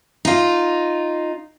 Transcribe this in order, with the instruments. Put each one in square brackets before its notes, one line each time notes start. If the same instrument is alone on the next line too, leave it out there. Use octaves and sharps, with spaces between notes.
[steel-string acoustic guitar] D#4 F4